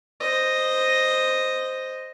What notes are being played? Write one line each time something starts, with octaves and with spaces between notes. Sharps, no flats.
C5 D#5